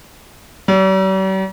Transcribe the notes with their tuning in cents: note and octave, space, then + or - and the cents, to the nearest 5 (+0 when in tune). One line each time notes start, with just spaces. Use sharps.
G3 -45